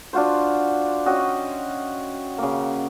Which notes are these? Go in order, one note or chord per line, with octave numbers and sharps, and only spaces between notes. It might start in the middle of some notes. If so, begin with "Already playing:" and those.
D4 F4 F#4 C5
C#4 F#4 D#5 G5
C#3 A#3